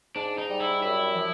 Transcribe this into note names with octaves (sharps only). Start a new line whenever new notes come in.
G#2 D4
D#4
G3
E4
F#2 E4
F3